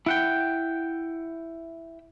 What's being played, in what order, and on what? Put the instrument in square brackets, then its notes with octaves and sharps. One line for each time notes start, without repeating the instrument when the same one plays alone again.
[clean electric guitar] E4 F#5 G5